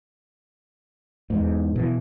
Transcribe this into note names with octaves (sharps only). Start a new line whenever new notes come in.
E2 G#2
B2 E3